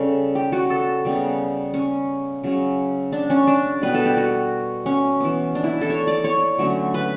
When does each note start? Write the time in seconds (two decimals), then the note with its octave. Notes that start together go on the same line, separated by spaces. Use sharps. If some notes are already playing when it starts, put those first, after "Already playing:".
Already playing: C#3 G3 C#4 A4
0.35 G4
0.52 F#4
0.70 A4
1.05 C#3 G3 B3
1.74 C#4
2.43 C#3 F#3 C#4
3.12 D4
3.30 C#4
3.47 D4
3.81 B2 G3 B3 B4
3.94 A4
4.06 G4
4.17 F#4
4.86 C#4
5.20 E3 B3
5.55 D4
5.64 E4
5.81 A4
5.90 C#5
6.07 D5
6.24 C#5
6.58 D3 F#3 A3 C#4
6.94 B4